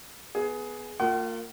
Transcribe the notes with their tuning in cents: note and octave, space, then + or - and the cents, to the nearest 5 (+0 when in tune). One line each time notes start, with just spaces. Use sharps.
B3 +0 G#4 +15
A#3 -30 F4 +10 F#5 +45